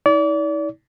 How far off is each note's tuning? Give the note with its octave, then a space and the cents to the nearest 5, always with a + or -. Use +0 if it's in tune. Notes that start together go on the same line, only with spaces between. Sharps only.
D#4 +45 D5 -35